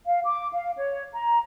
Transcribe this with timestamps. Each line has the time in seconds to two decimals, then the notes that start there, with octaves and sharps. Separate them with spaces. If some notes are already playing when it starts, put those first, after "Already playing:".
0.07 F5
0.25 D6
0.53 F5
0.78 C#5
1.13 A#5